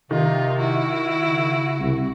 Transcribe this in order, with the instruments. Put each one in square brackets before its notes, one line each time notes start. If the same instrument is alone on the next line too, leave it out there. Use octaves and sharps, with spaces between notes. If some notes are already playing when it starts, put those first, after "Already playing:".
[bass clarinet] C3 [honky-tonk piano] D#3 [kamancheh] D#4 F4
[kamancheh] E4 F#4
[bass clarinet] C#3
[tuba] C2